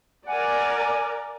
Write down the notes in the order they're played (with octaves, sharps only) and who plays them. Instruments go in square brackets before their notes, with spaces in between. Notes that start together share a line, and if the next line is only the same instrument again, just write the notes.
[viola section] A#4 D5 [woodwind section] F#5 G#5